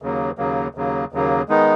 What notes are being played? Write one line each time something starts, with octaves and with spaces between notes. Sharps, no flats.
D#2 C#3 F#3 A#3
D#2 C#3 F#3 A#3
D#2 C#3 F#3 A#3
D#2 C#3 F#3 A#3
D#3 G#3 B3 D#4